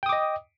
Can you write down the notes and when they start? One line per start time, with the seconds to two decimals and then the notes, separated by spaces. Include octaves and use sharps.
0.03 G5
0.06 D#6
0.09 D6
0.13 D#5